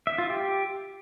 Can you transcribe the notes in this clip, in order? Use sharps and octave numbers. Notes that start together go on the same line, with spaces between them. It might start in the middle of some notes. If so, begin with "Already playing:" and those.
E5
F4
G4